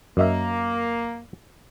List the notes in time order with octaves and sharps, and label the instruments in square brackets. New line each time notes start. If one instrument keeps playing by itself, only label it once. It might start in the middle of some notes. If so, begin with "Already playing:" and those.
[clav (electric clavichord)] F#2 D#5 E5 [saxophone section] A#3